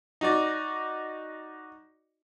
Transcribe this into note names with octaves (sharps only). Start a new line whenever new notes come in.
D#4 F#4 D5